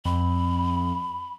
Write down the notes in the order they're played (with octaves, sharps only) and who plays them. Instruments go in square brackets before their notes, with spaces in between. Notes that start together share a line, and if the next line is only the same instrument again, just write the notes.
[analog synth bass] F2 [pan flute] B5